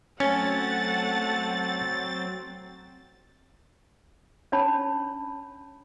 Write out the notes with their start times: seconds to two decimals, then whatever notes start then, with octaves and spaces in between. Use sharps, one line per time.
0.20 F#3 A3 C4 C#4 F#5 A6
4.52 C#4 D4 C#5 A5 B5